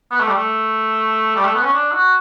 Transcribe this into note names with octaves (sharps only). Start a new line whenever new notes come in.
B3
A3
G3
A3
G3
A3
B3
C#4
D4
F#4